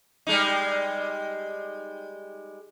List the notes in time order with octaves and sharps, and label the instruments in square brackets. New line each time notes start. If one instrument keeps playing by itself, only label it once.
[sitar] G3 G#3 D#4